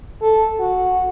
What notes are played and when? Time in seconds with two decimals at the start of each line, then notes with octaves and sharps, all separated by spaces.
0.22 A4
0.60 F#4